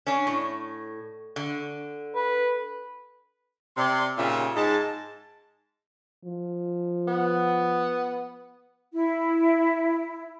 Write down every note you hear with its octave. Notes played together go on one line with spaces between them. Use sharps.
C#4 D4
A2
D3
B4
C3 D5 C6
A#2 C#3 D#4 F4 G4 E5
G#2 G#3 A5
F3
B3
E4